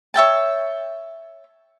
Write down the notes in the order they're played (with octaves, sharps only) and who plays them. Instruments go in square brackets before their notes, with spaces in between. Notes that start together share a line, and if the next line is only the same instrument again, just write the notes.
[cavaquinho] C#5 E5 G5 A5